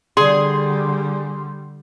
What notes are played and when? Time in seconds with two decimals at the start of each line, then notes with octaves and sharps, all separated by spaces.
0.17 D3 G3 D4 G#4 C6